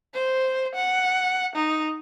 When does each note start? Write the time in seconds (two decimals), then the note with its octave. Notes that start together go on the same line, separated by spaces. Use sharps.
0.15 C5
0.75 F#5
1.56 D#4